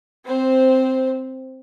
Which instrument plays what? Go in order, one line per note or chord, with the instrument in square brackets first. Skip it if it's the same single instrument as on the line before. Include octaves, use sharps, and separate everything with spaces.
[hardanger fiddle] C4 C5